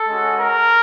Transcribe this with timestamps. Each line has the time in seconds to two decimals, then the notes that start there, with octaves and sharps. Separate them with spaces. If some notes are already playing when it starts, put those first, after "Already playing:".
Already playing: A4
0.09 G#3 C#4 F#4
0.41 A#4